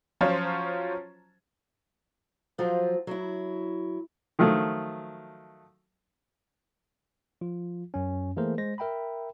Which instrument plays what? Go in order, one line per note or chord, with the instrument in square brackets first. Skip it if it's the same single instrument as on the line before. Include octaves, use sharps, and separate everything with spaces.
[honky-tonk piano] F3 F#3 C#4 F4 C5
[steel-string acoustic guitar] F3 F#3 F4 C5
F#3 E4
[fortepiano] D#3 F3 F#3 A3
[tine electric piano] F3 F4
F#2 C#4
E3 A3 A#3 G#4 A#4 C5
G#3 C5 A#6
A#4 E5 G5 A#5 B5